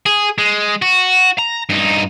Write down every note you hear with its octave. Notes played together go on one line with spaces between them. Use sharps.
G#4
G#3
F#4
A#5
G2 D#4